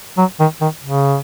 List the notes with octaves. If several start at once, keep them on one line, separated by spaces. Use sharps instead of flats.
F#3
D#3
D#3
C#3